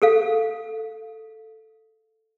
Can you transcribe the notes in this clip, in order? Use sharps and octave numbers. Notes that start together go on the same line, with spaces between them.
G#4 A4 F5